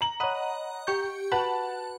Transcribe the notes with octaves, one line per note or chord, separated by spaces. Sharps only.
A#5 F#7
C#5 D#5 F#5 B5
G4 C#6 G6
F#4 B4 F#5 A5 B5